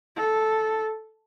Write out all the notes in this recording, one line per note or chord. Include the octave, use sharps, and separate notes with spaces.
A4